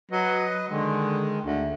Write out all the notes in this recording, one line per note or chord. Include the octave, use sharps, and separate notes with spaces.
F#3 B4 D#5
D3 D#3 G#3
D2